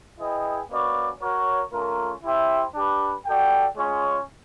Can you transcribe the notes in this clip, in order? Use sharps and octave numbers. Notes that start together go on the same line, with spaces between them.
E4 G#4 B4 D#5 G5
A#3 C#4 F#4 B4 D5
F#4 A#4 C#5
A3 C#4 F4 A#4
E4 G4 C5 E5 G5
D4 G4 B4
F#4 A4 D5 G5
G#3 C#4 F4 G#4 C#5